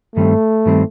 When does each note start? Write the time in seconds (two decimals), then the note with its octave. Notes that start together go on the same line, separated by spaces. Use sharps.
0.15 G2 D#3 G3 A3 C4
0.66 G2 D#3 G3 C4